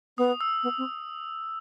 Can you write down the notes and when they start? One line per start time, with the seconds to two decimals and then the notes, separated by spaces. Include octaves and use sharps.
0.18 B3 D#6
0.41 E6
0.63 B3
0.78 C4